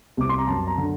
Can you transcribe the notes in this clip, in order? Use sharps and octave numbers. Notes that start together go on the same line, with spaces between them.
C2 D6
C6
A#5
F#2 A5
A#5
D3